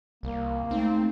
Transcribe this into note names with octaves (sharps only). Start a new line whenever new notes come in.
C2 A#3
G#3 A3 C4 D#4